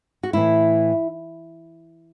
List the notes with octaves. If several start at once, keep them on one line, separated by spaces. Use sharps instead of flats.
F#4
A2 E3 E4